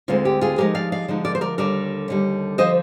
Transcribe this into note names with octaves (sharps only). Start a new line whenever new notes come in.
D2 D3 G#3 C4 F4
G4
F4 G#4
D3 F3 G#3 D#4 G4 A#4
D5 F5
D5 F5
D3 F3 G#3 D#4
A#4 D5
C5
A#4 D5
D#2 D3 G3 A#4 D5
D#2 D3 G3
D3 F3 C5 D#5